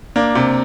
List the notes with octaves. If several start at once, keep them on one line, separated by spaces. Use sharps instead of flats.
A#3 D4
C3